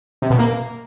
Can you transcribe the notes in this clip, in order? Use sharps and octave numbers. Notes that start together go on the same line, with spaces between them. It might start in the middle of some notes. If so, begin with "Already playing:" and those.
C3
B2
A#3